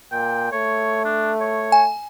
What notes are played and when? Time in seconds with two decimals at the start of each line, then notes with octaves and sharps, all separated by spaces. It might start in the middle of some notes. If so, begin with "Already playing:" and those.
0.12 A#2 G5
0.52 A3 C#5
1.05 D4
1.40 C#5
1.72 G#5